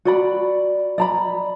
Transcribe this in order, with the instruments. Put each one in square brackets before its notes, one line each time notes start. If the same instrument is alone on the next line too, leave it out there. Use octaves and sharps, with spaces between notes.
[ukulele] F#4 D5 B5
D5 A#5 B5